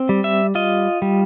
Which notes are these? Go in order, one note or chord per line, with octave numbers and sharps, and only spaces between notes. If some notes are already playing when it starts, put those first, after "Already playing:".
Already playing: C4
G3
E5
F4 D#5
G3